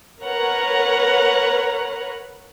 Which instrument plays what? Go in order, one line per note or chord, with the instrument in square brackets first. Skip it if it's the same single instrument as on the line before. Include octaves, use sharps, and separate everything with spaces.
[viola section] A#4 B4 C#5 F#5 A#5